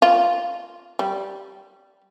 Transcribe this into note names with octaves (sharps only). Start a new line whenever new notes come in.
F4
G3